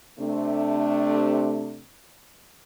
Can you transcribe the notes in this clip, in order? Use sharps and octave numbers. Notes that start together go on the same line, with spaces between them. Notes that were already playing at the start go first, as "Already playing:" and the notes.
C3 A3 D4